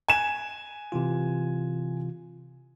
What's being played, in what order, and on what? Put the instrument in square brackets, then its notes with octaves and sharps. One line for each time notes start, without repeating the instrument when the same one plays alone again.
[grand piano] G#5 E7
[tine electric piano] C3 E3 F4